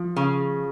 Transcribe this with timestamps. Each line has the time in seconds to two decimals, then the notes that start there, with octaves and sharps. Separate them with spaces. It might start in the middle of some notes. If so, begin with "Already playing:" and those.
Already playing: F3
0.16 C#3